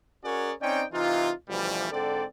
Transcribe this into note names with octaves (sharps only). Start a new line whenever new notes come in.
C#4 F#4 G#4 A#4 C#5 D5
C4 C#4 D#4 D5 G5
C3 E3 D#4 F4
D2 B2 E3 F3 G3
G#2 D3 C4 A4 D5